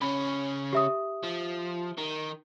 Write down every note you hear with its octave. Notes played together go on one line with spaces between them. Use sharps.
C#3 C#4 B5
G4 E5 D#6
F3
D#3